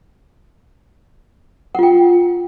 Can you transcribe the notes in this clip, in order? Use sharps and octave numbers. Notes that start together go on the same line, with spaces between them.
F4 F#5 G5